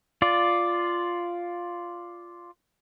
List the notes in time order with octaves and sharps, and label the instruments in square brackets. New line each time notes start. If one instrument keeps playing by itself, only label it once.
[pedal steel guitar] F4 D5